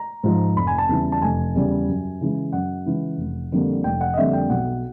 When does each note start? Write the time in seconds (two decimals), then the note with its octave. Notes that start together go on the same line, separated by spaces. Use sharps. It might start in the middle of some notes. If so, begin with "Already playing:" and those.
Already playing: A#5
0.24 G#2 F3
0.56 F1 B5
0.67 G#5
0.78 A5
0.89 E2 C#3 E3 G3
1.12 A5
1.22 F1 G#5
1.55 E2 C#3 E3 G3
1.88 F#2
2.21 C#3 E3 G#3
2.52 F#2 F#5
2.86 C#3 E3 G#3
3.18 F1
3.52 F2 D3 G3 A#3
3.84 F1 G5
4.01 F#5
4.14 D#5
4.18 F2 D3 G3 A#3 E5
4.33 G5
4.49 B1 F#5